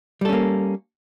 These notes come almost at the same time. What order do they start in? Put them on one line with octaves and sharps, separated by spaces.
G3 A4 C#4 A#3